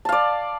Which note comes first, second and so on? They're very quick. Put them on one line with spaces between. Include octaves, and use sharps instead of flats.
A5 F5 D5